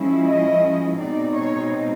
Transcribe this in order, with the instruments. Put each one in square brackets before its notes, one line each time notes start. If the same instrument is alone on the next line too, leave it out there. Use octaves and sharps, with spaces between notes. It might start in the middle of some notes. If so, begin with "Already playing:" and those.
Already playing: [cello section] F3 G#3 C#4 E4
D#5
B2 G#3 C4 D#4 D5
C#5